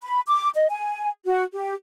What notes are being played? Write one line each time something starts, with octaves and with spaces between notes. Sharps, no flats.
B5
D6
D#5
G#5
F#4
G4